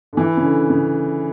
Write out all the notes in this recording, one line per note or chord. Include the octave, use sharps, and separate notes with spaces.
D3
E3
C#3
D3
C#3